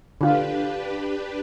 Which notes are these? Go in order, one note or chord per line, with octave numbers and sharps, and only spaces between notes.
D3 D4 F4 G4 B4